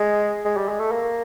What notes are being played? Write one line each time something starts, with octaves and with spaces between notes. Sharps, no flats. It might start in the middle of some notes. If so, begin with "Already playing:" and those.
Already playing: G#3
G#3
G3
G#3
A3
A#3